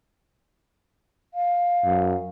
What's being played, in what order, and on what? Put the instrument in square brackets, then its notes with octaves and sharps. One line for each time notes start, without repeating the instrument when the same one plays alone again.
[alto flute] F5
[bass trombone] F#2